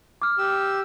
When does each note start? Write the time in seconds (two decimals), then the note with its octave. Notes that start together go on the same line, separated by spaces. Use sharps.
0.22 D6 F6
0.38 G4 E6